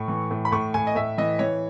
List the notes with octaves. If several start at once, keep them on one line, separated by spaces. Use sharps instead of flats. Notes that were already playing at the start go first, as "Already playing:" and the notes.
Already playing: A2 C#6
E3
A2
B5
A2 C#6
A2 G#5
D#5
A2 E5
E3 D#5
E3 C#5